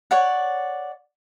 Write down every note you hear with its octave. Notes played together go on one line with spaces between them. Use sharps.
C#5 D5 F#5